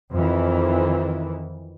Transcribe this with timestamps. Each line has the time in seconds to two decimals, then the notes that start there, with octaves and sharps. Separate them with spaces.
0.13 F2 D#3 E3